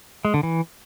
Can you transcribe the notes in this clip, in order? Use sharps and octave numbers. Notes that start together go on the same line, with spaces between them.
G#3
D3
E3